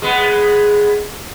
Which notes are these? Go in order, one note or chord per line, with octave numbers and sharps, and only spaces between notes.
G#3 B3